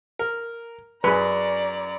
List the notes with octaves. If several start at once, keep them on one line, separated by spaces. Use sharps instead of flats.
A#4
F#2 G#4 B4 D5 A#5